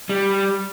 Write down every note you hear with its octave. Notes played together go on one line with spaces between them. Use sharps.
G3